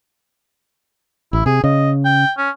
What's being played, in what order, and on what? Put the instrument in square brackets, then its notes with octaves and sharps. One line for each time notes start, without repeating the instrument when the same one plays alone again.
[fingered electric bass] A1 [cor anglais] E4
[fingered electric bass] C3 [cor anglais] G#4
[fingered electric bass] C#3 [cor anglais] D#5
[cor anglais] G5
C#4